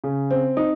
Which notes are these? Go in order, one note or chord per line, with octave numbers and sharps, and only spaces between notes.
C#3
C4
D#4